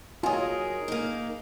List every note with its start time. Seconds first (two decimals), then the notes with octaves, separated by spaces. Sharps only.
0.23 F#3 D#4 F4 G#4 A#4 G#5 D#6
0.88 A#3 D#4